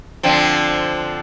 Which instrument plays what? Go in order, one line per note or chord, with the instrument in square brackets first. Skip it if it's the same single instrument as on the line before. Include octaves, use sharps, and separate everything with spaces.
[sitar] D3 F3 C4